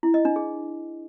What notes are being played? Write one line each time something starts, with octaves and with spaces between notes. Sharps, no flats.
E4
D#5
D4
G#4